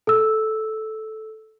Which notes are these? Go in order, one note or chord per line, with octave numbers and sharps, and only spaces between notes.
A4 E6